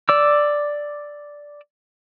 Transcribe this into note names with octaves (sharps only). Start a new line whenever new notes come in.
D5 D6 E6